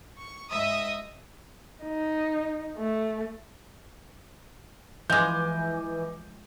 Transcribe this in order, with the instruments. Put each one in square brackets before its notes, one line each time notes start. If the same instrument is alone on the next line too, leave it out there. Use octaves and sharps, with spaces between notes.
[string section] C#6
G#2 D#5 E5 D#6
[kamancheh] D#4
A3
[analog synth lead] E3 [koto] F3 G#3 [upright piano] D#5 G#5 D6 [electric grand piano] G6